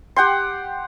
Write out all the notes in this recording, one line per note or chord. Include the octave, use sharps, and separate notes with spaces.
G4 F#5 G5 C6